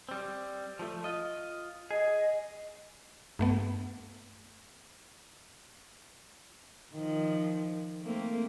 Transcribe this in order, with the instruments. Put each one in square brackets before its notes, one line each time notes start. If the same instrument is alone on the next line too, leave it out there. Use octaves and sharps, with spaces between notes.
[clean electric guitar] G3 C4
F3 A3
F4 D#5
[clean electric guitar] G#4 [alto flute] D#5
[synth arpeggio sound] G2 A3 B3
[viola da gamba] D#3 F3
A3 A#3 C4